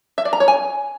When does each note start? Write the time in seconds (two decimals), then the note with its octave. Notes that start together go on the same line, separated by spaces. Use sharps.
0.18 E5
0.25 D5
0.33 A#5
0.40 C#5
0.48 G#5